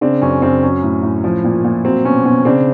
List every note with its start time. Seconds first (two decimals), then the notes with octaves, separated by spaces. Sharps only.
0.01 C#3 C4 D4
0.22 F#2 C#4
0.42 F#2 C4
0.62 F#3 C#4
0.83 A2
1.03 A2
1.24 F3
1.44 A#2
1.65 A#2
1.84 F#3 C4
2.05 B2 C#4
2.25 B2 C#4
2.45 C#3 C4 D4